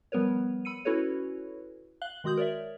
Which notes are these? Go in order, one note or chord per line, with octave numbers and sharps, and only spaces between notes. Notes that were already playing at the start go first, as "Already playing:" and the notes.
F3 G3 B3 A#4 B4 C#5
B5 E6 C#7 D#7
C#4 E4 F#4 A4 B4 C#5
F5 F#6 F#7 G7
D#3 G#3 F#4 D#6 G6 F#7
A#4 C#5 D5 E5